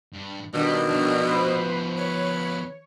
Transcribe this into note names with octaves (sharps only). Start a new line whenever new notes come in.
G2
B2 D#3 G3 D4
F3 B3
B4 C5 B5
B4 C#5